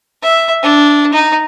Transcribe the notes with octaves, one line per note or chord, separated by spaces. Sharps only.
E5
D4
D#4